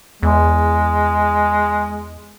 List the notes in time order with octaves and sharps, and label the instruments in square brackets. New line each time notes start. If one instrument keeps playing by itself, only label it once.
[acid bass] E2 [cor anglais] G#3